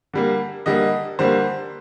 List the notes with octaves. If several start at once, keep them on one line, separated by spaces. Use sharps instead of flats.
D3 G3 A#3
D3 G3 A#3 D#5
D3 G3 A#3 C5